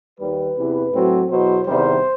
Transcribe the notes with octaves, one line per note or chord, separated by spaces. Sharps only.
D#2 D#3 G3 B4
E2 C3 E3
A2 F#3 A3 C4
E2 B2 F#3 C5
E2 C3 D#3 G3 C5